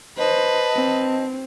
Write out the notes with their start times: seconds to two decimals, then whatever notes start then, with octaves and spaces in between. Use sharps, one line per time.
0.18 B4 C5 D#5 A5
0.76 C4